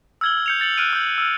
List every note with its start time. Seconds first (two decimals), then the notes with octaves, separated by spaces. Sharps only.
0.21 E6 F6 G#6 F#7 G7
0.46 G6 C#7 F7
0.60 G6 A6 C#7 F#7
0.78 F6 F#6 D7 D#7
0.93 E6 G6
1.18 E6 F6